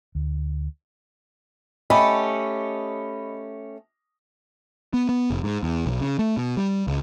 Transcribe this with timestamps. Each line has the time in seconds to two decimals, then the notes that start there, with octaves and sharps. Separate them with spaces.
0.15 D2
1.90 A3 C#4 G4 D#5 B5
4.94 B3
5.09 B3
5.30 F1
5.43 G#2
5.63 E2
5.86 B1
6.01 C#3
6.19 A3
6.37 B2
6.57 G3
6.87 C#2